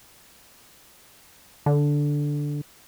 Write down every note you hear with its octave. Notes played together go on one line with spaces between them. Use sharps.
D3